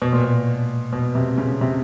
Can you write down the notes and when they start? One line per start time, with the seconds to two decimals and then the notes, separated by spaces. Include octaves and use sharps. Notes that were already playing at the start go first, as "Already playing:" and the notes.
0.02 B2
0.13 A#2
0.24 B2
0.93 B2
1.15 C3
1.38 C#3
1.61 C3